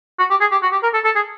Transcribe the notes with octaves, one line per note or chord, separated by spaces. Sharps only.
F#4
G4
G#4
G4
F#4
G4
A#4
A4
A4
G#4